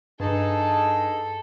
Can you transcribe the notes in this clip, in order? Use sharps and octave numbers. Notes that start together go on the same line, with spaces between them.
G2 D#4 G#4 A4 A5